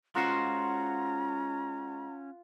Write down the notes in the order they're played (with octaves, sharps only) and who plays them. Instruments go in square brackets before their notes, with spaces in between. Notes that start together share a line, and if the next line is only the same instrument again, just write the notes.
[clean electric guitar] G#3 F#4 C5 [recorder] C#4 [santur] F4 F#5 [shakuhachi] A#5